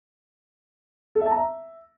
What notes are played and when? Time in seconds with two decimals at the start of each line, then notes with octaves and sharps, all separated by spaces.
1.15 A4
1.21 E5
1.26 A5
1.31 A#5
1.36 E5